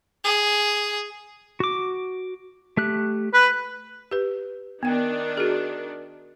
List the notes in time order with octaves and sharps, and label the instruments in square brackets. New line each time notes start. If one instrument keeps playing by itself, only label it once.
[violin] G#4
[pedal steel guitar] F#4 D6
A3 G4 F#6
[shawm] B4
[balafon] G4 B4
[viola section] D#3 D4 [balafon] B3 G5
[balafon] F#4 G#4